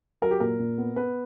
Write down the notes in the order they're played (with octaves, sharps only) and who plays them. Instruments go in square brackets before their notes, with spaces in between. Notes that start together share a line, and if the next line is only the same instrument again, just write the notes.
[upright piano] F#3 A#4
G4
A#2 A#4
A#2
B3
B3 B4